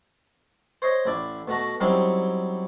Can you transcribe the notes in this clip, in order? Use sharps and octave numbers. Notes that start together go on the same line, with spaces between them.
C5 C#5 D#5
A1 E4 D5
B2 A3 F#4 A#5
F#3 G3 C4 C#4 D#4 E4